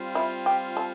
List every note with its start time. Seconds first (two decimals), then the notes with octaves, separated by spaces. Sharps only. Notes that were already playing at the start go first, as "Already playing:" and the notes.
Already playing: G3 C4 F4
0.15 E4
0.46 G4
0.77 A4